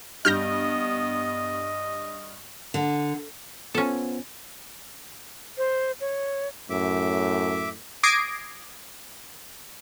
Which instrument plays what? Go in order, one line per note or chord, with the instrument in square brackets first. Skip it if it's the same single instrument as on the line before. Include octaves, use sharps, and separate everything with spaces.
[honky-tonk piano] G2 G3 [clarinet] B3 [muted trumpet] D#5 [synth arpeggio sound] F6 G6 A#6
[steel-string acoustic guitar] D3
[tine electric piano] B3 F4 C5 [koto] C#4 A4
[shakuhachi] C5
C#5
[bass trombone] F#2 [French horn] A2 [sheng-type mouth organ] E5 D6
[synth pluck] D6 D#6 G#6 A#6 C7 D7